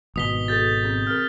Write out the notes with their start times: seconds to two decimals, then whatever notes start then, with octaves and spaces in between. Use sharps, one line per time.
0.16 G#1 B2 D#6 B6 G7
0.48 F#4 G#4 A4 G6 A6
0.83 C4 G#4
1.07 C4 G#4 A#4 F6